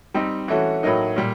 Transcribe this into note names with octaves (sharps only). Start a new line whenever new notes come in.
G3 C4 D#4
E3 A3 C#4 F#4
A2 F#3 A#3 D#4
A#2 G3